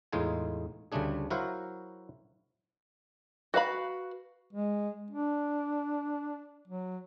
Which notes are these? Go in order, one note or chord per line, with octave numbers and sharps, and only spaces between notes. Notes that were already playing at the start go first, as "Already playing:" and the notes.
E2 A2 G#3 D#4 F4 G#5
D2 C#3 G3 A3 D4 G#4
F#3 E4 F#4 A#4 C5 F5
F#4 B4 F5 B5
G#3
D4
F#3